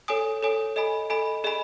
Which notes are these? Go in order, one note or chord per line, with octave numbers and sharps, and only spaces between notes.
A4 C#5 G#5 D#6
A4 C#5 G#5 D#6
A4 D#5 G#5 B5
A4 D#5 G#5 B5
G#4 D#5 G#5 B5